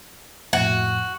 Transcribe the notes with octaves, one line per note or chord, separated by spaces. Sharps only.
F2 A2 F#4